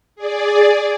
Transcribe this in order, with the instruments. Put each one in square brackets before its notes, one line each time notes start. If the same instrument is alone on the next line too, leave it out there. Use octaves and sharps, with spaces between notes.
[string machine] G#4 D5